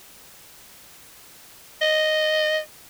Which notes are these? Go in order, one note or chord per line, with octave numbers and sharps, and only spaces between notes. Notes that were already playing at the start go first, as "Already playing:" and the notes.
D#5